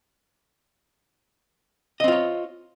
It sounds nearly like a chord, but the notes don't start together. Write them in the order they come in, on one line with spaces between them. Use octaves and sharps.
D#5 C4 F4 C#5